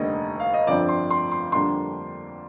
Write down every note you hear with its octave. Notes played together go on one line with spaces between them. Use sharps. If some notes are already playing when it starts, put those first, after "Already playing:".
Already playing: F1 D#2 D3 G3 D#5
F5
D#5
G1 F2 D3 F3 C4 D5
C6
C6
C6
F2 D3 G3 A#3 D4 C6